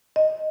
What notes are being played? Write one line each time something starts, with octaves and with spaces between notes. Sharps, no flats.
D#5